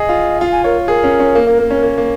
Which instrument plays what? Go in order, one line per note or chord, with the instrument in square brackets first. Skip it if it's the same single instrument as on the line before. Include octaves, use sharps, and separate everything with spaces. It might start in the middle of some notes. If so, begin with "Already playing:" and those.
Already playing: [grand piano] G#4 [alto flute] D#5
[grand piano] F4
[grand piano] F4 [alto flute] F5
[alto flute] G#5
[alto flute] A#4 [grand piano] C#5
[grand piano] G#4 [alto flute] A#4
[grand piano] C#4
C#4
A#3
A#3
A#3
C#4
A#3
A#3